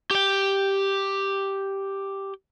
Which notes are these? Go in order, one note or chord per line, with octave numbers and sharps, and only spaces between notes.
G4 G5